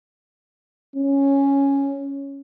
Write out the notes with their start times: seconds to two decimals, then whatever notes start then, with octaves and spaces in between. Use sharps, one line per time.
0.96 C#4